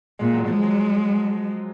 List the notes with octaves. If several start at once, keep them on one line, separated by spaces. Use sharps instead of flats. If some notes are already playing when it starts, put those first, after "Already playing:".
A#2 G#3
F#3
F3 G#3
F#3